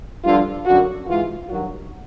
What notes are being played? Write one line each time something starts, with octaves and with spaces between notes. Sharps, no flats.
G2 D3 F3 F4
F#2 D3 F#3 F#4
G#2 E3 F4
G2 D#3 F#3 F#4